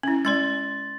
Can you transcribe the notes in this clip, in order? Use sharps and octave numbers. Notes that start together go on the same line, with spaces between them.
C#4 E4
G#3 C#4 D5 C6 A6